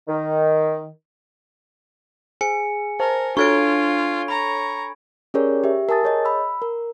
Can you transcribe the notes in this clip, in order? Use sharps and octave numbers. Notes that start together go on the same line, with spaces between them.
D#3
G#4 G#5 C#7
A#4 C5 A5
D4 F4 A4 C#5 C#6 G#6 D7
A#5 B5 C#6
C#4 G4 G#4 A#4 C#5 D5
G4 E5
A#4 G#5 A5 D#6 A6
G#4 C#5 D#5
B5 E6
A#4